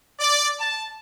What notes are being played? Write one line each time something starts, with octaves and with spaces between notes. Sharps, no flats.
D5
A5